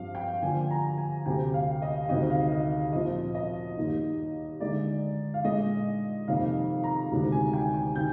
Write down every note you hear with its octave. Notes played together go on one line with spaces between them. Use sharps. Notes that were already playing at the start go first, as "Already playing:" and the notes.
Already playing: G2 F3 C4 F5
G5
D3 F3 A#3 F4 G#5
A#5
G#5
D2 C3 G3 C4 G5
F5
D#5
D2 C3 D#3 G3 C4 D#5
F5
D#5
A#2 F3 C4 F4 D#5
D#5
D#2 D#3 G3 A#3 D#4
D3 G#3 D#4 D5
F5
A#2 G#3 D4 D#5
F2 C3 D#3 A#3 F5
A#5
D2 C3 D#3 G#3 D4
G#5
G5
G#5
C3 D#3 G6